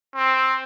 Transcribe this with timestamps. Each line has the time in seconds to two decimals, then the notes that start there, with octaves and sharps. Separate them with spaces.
0.15 C4